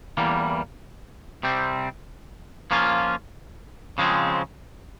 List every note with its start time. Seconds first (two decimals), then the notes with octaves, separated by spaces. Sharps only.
0.17 E2 E3 G3 A#3
1.43 C3 G3 C4
2.71 F3 A#3 C#4 F4
3.98 C#3 F3 G#3 C4